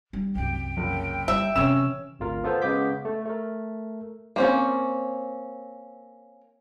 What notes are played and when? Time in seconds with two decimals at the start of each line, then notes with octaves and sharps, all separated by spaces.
0.13 G3
0.35 C2 F#2 G5
0.77 F#1
1.28 G3 E5
1.56 C3 E3 C#4 E6 E7
2.19 G#1 D2 F4 A#4
2.44 B3 F4 A4 C5
2.62 C#3 G#3 B3 D6 G6 B6
3.05 A3
3.26 A3 A#4
4.36 A#3 C4 C#4